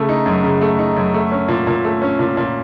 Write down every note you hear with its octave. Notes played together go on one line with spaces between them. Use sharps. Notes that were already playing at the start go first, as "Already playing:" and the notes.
Already playing: C#3 A3
D#4
F#2
C#3
A3
D#4
F#2
A3
C#4
A#2
A#2
A3
C#4
A#2
A#2